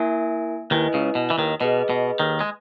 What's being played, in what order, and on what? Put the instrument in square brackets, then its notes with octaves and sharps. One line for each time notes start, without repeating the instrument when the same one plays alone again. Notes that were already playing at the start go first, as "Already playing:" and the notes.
Already playing: [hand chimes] A#3 E4 A#4 E5 G#5
[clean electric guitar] D#2 D#3 [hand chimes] E4 B4 D#5 G#5
[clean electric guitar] C#2 C#3
B2
E3
D#2 D#3
[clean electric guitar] B2 [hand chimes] G#4 B4 D#5
[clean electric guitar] B2
D#2 D#3
G#3